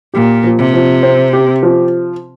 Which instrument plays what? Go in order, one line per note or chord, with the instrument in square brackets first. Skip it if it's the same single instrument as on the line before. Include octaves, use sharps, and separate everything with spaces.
[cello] A#2 [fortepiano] G4
[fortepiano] F3
[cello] C3
[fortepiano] F3
C4
G4
F3